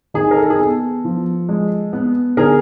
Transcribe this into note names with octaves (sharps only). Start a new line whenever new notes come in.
D#3 G#4
A#4
A4
G#4
B3 A4
F3
G#3
B3
D3 G#4 A#4